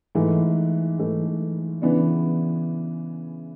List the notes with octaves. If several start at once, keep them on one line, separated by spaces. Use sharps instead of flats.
G#2 E3 A3
G#2 E3 A3
C#3 E3 B3 D4